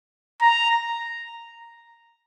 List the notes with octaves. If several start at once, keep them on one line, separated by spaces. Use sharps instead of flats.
A#5